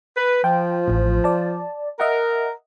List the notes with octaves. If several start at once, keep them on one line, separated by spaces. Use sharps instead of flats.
B4
F3 G5
A1 A2
D5 A5
A#4 D#5 E5 F#5